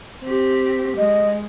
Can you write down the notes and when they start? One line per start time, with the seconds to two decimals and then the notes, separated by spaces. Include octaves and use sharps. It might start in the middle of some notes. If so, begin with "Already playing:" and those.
0.24 C4 G4
0.98 G#3 D#5